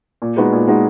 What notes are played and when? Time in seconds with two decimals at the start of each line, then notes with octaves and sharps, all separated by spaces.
0.22 A#2
0.37 G#3 B3 D#4 F#4
0.53 A#2
0.67 G#3 B3 D#4 F#4